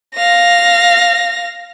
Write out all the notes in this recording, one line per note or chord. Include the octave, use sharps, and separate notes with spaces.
F5 A#6